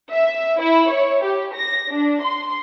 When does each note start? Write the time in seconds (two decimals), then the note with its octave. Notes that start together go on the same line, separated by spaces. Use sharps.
0.12 E5
0.62 E4
0.91 C#5
1.24 G4
1.55 A#6
1.89 D4
2.23 C6